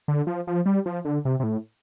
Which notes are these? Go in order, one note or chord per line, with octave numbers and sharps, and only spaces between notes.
D3
F3
F3
G3
F3
D3
C3
C3
A2